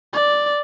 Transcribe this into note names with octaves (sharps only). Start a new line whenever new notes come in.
D5